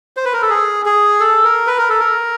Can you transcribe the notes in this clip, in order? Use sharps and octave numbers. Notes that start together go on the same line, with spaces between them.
C5
B4
A#4
A4
G#4
G#4
A4
A#4
B4
A#4
A4
A#4